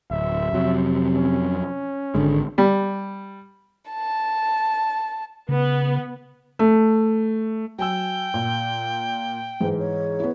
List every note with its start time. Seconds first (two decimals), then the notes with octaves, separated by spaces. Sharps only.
0.11 D1 E5
0.53 F2 C3 F#3
1.14 C#4
2.15 G#1 D3 G#3
2.58 G3
3.91 A5
5.49 C#3 B3
6.59 A3
7.79 F#3 G5 G#5 E6
8.34 A#2
9.60 G#2 E3 C5
9.79 C#5
10.20 B3 E4